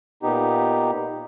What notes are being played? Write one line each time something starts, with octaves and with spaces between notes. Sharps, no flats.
A#2 B3 D#4 G4